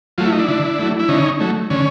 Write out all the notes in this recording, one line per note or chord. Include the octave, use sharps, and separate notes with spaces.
F#3 A3 F4
E4
D#4
D4 E4
D3
F#3 A3
E4
D3 C#4 D#4
F#3 A3
D3 C#4